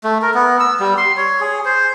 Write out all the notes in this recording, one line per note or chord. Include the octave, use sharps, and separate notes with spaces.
A3
A#4
B3
E6
G3
C6
C#5
G#4
C5